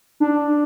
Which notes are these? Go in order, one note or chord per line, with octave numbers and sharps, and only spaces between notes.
D4